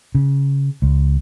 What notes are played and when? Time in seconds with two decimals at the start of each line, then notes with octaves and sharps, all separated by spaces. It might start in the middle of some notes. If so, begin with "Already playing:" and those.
0.15 C#3
0.82 C#2